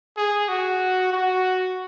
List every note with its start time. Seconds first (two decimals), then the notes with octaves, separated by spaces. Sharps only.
0.17 G#4
0.49 F#4
1.12 F#4